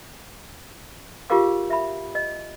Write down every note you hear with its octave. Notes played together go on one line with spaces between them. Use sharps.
F4 G4 G#4 A#4 F5 D6
E5 B5
D#5